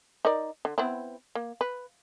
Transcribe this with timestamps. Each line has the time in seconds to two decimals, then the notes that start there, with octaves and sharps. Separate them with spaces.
0.25 D#4 A#4 D5
0.65 D3
0.78 B3 C4 E4
1.35 A#3
1.61 B4